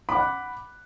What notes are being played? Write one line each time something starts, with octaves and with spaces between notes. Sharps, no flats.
F#5 B5 D6 F#6